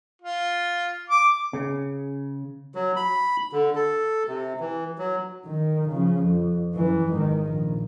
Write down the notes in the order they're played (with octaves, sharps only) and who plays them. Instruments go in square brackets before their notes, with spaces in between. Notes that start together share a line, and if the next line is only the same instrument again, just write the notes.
[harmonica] F4
D6
[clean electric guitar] C#3
[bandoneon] F#3
B5
D3
A4
C3
E3
F#3
[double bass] D#3
C#3 F3
F2
F#2 E3
G#1 D#3
A#1